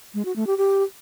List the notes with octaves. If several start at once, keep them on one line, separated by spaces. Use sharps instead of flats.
G#3
F#4
A3
G4
G4